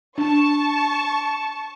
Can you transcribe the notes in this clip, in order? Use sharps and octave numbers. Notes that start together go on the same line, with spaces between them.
D4 A5 C#6